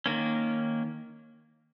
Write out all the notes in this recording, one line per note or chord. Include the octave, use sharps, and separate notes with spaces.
D#3 A#3 C#4